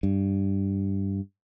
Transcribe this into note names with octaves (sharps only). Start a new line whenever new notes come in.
G2